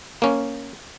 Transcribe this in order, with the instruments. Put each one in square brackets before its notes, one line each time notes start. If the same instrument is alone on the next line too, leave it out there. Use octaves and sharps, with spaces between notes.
[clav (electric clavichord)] A#3 C#4